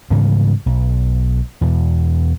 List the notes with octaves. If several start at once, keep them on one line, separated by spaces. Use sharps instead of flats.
G#2 C#3 E3 G3
B1
E2 B2